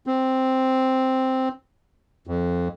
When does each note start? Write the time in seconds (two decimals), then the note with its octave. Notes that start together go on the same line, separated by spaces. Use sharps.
0.07 C4
2.27 F2